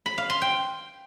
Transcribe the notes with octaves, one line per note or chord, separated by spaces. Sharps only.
B5
F5
C6
G5